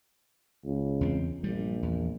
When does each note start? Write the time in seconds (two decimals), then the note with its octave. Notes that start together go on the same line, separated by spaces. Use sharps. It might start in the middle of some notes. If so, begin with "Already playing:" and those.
0.65 C#2
1.01 E2 A#3 C4
1.43 A#1 G2 G3
1.82 E2